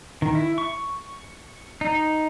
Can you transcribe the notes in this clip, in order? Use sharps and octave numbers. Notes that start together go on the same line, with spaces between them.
D#3
E4
C#6
D#4